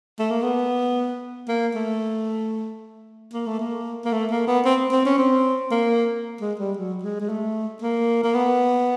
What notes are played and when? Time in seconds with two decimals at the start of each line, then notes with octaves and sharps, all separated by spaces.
0.19 A3
0.31 A#3
0.42 B3
1.48 A#3
1.75 A3
3.33 A#3
3.47 A3
3.60 A#3
4.05 A#3
4.13 A3
4.31 A#3
4.47 B3
4.65 C4
4.92 C4
5.06 C#4
5.18 C4
5.71 A#3
6.41 G#3
6.60 G3
6.77 F#3
7.03 G#3
7.20 G#3
7.29 A3
7.82 A#3
8.24 A#3
8.34 B3